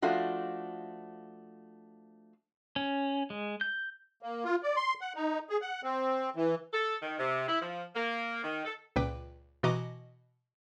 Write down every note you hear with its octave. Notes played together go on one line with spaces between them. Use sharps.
F3 A3 D4 F4 F#4
C#4
G#3
G6
A#3
F4
D5
C6
F#5
D#4
G#4
F#5
C4
E3
A4
D#3
C3
E4
F3
A#3
D#3
A4
C#2 A#2 B4 G5 D6
B2 E3 F#4 D#5 A#5 D6